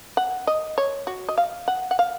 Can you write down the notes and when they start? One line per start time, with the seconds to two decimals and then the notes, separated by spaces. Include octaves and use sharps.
0.17 F#5
0.47 D#5
0.78 C#5
1.07 F#4
1.29 D#5
1.38 F5
1.68 F#5
1.91 F#5
1.99 F5